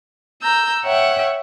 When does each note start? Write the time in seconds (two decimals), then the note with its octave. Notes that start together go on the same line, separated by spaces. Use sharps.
0.42 A#5 E6 G6
0.85 C#5 E5 F#5 G5